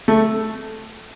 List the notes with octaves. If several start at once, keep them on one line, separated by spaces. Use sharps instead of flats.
A3